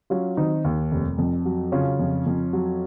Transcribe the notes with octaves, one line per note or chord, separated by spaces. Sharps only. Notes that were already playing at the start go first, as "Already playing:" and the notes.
F#3 C#4 F4
D#3 C4 D#4
D#2
F1
F2
F#3
C#3 C#4 F4
F2
F2
F#3